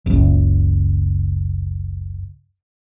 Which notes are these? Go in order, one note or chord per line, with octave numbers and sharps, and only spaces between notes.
F#1 C#2